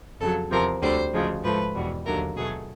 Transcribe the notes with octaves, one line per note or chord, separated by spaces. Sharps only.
F2 C#3 F#3 A4
E2 C3 F3 A#4
D2 D3 G3 C5
D2 C#3 F3 G#3
G#2 F3 A3 B4
E2 B2 G3
D#2 D3 F#3 A3 A#4
B2 F#3 A3 G#4